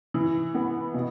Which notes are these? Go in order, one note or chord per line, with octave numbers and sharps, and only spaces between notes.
E3
B3
B2